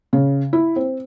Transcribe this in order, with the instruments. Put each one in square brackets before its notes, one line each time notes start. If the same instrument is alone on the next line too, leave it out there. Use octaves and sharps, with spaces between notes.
[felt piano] C#3
E4
C4